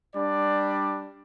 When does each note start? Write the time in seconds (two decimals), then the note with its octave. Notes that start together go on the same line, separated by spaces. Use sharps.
0.15 G3 D4 D5